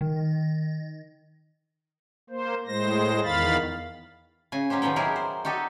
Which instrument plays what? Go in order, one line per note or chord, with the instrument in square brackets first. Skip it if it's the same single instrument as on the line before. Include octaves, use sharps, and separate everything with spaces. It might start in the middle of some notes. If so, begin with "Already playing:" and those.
[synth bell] D#3
[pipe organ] A#3 C5
A2 G#3 C5 A#6
E2 D#3 F5 B5 A6
[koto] C#3 G#5
F#3 C#4 D#4 G4 C5
B2 D#3 F3 B3 G5
F#3 B3 E4 G4 G#4 A#4
C5
D#4 F#4 G4 A4 D#5